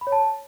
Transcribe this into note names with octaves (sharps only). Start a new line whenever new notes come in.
B5
C#5
A5